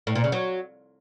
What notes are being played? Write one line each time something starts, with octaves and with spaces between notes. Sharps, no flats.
A2
A#2
C#3
F#3